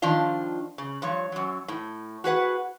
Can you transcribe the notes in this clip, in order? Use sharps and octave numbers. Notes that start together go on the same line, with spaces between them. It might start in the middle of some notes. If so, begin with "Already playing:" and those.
D#3 F3 D4 F4
C#3
G2 F3 C#5
F#2 F#3
A2
F#4 G#4 B4 F#5